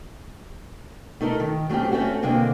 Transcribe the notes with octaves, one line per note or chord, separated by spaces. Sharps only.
A3 D#4 A4 A#4
D#3
F#3 A3 C4 C#4 G4
A3 C4 C#4 F#4
B2 D3 G#3 A#3 C4